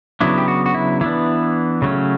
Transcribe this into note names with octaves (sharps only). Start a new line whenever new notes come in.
C#3 F#3 B3 D4 E4
G4
F#4
F#4
E4
E3 B3 D4 E4
C#3 F#3 A3 C#4